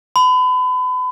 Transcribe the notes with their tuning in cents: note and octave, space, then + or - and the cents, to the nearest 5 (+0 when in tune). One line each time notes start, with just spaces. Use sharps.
B5 +35